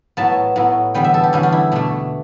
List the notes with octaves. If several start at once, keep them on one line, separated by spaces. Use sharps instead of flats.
A2 F#3 B3 A5
A2 F#3 B3
E2 D3 G3 B3 G5
E5
A4
G4
E2 D3 G3 B3 C#4
D4
E4
B2 A3 D4